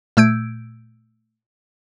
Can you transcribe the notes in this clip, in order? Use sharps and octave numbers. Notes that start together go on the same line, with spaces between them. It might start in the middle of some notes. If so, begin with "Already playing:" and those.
A#2 A3 E6 G6 G#6 D7